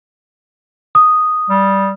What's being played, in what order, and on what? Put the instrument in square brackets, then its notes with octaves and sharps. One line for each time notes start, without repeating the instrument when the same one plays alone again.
[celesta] D#6
[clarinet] G3